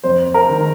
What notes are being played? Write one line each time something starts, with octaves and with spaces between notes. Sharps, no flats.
F2 C5
A#4
D#3 G#3